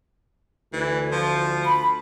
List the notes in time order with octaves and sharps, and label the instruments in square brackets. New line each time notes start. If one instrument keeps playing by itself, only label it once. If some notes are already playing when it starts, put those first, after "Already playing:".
[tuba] D2 [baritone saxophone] E3
[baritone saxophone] F3
[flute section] B5